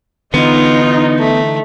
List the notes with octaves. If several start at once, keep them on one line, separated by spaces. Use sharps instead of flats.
D3 E3 B3 D#4 F4
A3